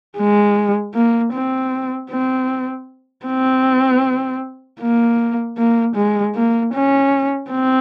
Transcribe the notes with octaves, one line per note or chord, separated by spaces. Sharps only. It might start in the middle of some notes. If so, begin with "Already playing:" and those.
G#3
A#3
C4
C4
C4
A#3
A#3
G#3
A#3
C#4
C4